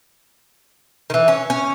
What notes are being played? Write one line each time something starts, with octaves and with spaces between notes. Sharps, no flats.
D#3 E3
C#4
C#4